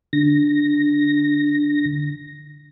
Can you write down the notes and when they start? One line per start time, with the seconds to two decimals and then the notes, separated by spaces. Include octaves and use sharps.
0.13 D3 A#6